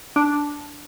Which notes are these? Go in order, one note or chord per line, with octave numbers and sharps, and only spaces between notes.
D4